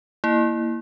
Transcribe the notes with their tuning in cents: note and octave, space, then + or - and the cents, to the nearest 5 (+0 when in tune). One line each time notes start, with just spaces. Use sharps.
A#3 +0 E4 +0